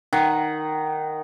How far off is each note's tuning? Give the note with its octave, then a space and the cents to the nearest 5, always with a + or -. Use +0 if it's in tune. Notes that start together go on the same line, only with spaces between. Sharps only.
D#3 -5 F#5 +0